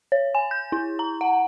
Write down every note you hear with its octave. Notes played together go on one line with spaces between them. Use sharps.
C#5
G#5
G6
E4
A#5
F#5